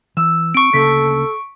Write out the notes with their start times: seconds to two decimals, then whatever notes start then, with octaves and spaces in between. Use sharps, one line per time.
0.17 E3 E6
0.54 C4 C#6 D7
0.73 D2 C#3 A#3 A4 B6